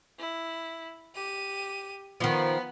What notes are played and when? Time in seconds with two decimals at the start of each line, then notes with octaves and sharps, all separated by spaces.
0.19 E4
1.15 G4 D#7
2.20 D#3 F3 B3